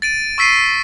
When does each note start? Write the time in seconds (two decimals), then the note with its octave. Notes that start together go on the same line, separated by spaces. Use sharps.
0.02 A6 D7 D#7
0.38 C#6 E6 B6 C7 D#7